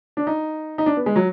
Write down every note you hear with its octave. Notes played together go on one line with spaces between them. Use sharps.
D4
D#4
D#4
D4
B3
G#3
F#3